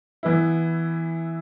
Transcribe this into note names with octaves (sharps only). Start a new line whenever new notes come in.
E3 B3 E4